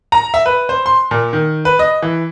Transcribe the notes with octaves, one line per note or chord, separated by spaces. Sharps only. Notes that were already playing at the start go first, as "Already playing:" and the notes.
A#5
E5
B4
C5
C6
A#2
D#3
B4
D#5
E3